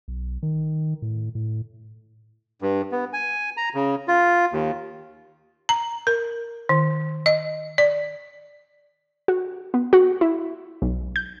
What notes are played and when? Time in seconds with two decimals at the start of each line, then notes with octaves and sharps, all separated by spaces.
0.08 B1
0.43 D#3
1.02 A2
1.35 A2
2.62 G2
2.92 B3
3.13 G#5
3.57 A#5
3.75 C#3
4.08 F4
4.52 D#2
5.69 A#5
6.07 A#4
6.69 D#3
7.26 D#5
7.78 D5
9.28 F#4
9.74 B3
9.93 F#4
10.21 E4
10.82 B1
11.16 G6